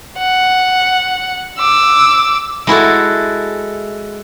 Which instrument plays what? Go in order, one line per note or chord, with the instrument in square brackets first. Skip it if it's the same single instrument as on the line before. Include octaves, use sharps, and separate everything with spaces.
[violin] F#5
D6 E6
[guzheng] G#3 E4 F#4 A4